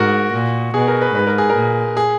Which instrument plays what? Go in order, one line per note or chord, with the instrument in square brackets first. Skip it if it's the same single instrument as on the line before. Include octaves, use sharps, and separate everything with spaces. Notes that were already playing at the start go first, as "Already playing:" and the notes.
Already playing: [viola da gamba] G#2 [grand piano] F#4 A#4
[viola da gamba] A#2
[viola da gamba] B2 [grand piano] G#4
[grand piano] A#4
B4
[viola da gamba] G#2 [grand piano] B4
[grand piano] A#4
G#4
A#4
[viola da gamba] A#2
[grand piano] G#4